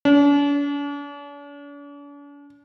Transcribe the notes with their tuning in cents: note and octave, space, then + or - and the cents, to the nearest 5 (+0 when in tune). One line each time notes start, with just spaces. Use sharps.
D4 -45